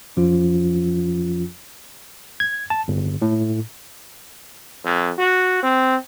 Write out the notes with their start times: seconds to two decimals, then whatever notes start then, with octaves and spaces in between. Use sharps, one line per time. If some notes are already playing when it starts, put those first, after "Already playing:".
0.17 F2 F3 C#4 F4
2.40 G#6
2.70 A5
2.88 G1
3.22 A2
4.85 F2
5.19 F#4
5.63 C4